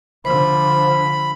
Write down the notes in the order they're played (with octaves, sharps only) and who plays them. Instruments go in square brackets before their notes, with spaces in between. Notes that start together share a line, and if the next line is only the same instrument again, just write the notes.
[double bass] D3 F3 [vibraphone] C5 [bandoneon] B5